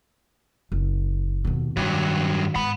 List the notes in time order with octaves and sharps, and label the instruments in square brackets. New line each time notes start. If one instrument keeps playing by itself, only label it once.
[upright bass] F#1
D#2 B2
[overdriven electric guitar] G2 F#3 [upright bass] D#3
[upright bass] G#2 [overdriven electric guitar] F#5 B5